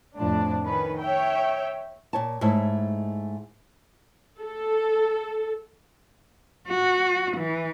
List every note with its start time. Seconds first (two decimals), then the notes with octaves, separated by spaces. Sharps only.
0.16 F2 A2 F3 D4
0.65 D#3 C#4 B4
1.01 C#5 E5 G5
2.13 A#2 C#5 A5
2.41 G#2 A3 D#4 E4 C#5 A5
4.41 A4
6.68 F#4
7.37 E3